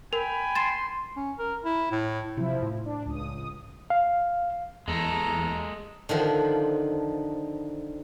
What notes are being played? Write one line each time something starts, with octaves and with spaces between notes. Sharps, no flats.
A#4 G5 G#5 B5
C6 A6 E7
C#4
A#4
E4
A2
C3 F3 E4
A2
D4
C#2 D#6
F5
E2 G#3 A4 A#5
D3 D#3 F3